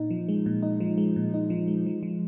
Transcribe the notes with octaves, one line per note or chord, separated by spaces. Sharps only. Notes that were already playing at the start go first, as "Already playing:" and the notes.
Already playing: A#2 D#4
F3
G#3
A#2
D#4
F3
G#3
A#2
D#4
F3
G#3
F3
F3